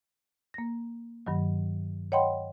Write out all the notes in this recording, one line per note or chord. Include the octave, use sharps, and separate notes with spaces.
A#3 A#6
G2 D#3 F#3
C#5 D#5 F#5 G5 B5 C6